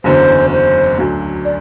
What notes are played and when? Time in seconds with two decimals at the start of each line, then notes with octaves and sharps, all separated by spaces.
0.04 F#1 E2 D3 F#3 C5
0.52 C5
0.98 D2 D3 F#3
1.45 D5